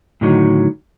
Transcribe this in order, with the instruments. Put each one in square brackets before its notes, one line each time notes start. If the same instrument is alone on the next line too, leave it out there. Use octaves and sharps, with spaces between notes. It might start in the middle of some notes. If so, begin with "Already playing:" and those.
[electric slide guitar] A2 D3 D#3 F#3 D#4 F#4